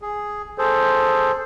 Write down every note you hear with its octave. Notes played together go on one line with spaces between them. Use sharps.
G#4
G#4 A4 C5